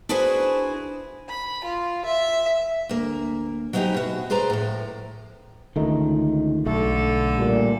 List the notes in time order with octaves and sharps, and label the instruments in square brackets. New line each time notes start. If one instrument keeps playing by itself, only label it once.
[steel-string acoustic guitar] D4 E4 F#4 G#4 B4 C5
[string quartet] B5
F4
E5
[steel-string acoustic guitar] D2 A#3
F#3 G#3 C4 D#4 E4 G4
B2 F#4
G#4 B4 C5 D5 A#5
A2 F3
[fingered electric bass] C#2 D#3 [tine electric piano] D3 A3 D#4
[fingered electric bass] B1 [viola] D3 A4 [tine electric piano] A3
[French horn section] A#2 [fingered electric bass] G3